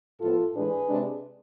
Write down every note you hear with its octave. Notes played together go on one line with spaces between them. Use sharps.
A2 F3 B3 F4 A4
A2 E3 G#3 D4 G#4 B4
C3 G#3 D4